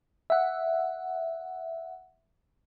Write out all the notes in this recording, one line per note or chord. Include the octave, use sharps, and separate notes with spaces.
E5 F#5